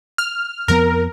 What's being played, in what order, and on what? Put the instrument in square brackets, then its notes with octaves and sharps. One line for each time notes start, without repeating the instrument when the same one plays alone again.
[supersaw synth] F6
[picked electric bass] F2 F3 B3 [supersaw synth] A#4